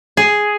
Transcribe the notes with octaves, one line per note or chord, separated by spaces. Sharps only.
G#4